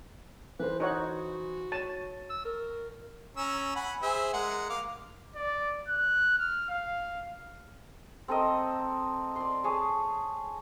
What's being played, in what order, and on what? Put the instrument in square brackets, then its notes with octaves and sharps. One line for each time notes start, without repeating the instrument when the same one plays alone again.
[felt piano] E3 A4 C5 [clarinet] B4
[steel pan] D#4 C#5 F#5 [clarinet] F#4
[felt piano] C#5 A6 D#7 [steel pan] A5
[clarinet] E6
A#4
[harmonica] C#4 A#5 E6
F#5 G#5 B5
G#4 C5 E5
G#3 A#4 F#5
A#3 F5 D6
[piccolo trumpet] D5
F#6
F6
F5
[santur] C4 A4 A#4 D#5
D5 C6
G#4 C#5 A5 D#6